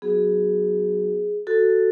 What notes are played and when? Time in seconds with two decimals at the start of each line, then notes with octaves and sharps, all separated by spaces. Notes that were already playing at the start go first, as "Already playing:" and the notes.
0.02 F#3 B3 D#4 F#4 G#4
1.47 F#4 A4